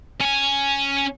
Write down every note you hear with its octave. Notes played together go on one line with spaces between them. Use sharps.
C#4 G#5